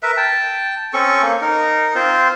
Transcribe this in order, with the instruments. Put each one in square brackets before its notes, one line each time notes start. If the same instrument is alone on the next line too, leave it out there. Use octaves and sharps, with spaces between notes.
[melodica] A#4 B4 E5
G5 A5
C4 C#4 A4 C#6
A#3
D#4 A#4
C4 F4 C5